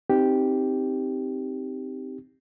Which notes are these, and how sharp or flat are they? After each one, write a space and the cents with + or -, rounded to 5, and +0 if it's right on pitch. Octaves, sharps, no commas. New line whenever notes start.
C4 +0 D#4 +0 G4 +0